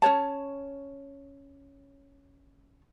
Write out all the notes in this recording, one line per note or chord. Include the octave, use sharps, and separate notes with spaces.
C#4 B4 C#5 A5